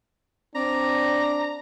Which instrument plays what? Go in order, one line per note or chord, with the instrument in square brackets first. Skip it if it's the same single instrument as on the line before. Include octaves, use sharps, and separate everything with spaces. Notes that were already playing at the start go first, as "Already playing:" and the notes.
[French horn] C4 [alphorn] D4 [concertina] D5 [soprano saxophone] A#5